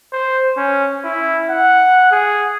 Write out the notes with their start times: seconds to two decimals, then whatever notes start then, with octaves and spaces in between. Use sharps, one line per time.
0.13 C5
0.57 C#4
1.04 E4
1.50 F#5
2.11 G#4